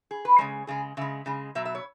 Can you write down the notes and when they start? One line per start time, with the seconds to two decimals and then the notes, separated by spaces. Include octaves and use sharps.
0.11 G#4
0.25 B4
0.38 C#3 G#3 C#5
0.67 C#3 G#3 G#4
0.97 C#3 G#3 E5
1.26 C#3 G#3
1.55 B2 F#3 E5
1.65 E5
1.75 C#5